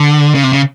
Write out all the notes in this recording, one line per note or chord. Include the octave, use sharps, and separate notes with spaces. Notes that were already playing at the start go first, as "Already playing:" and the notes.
Already playing: D3
C#3
C3
C#3